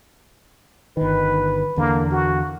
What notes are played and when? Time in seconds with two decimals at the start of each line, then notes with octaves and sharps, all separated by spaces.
0.97 G1 D#3 B4
1.77 E2 D3 A#3
2.11 F#4